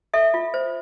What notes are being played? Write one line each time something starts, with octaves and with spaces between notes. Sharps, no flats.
A4 E5
F4
C5